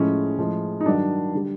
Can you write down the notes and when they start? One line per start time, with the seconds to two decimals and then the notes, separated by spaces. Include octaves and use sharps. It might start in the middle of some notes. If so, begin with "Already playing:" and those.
Already playing: A2 F3 G#3 C#4
0.38 A2 F3 G#3
0.80 D#4
0.85 G2 D#3 F#3 D4
1.35 D3 G3